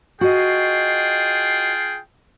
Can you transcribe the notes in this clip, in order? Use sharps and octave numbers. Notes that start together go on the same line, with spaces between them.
F4 F#4 G#4 D#5 G5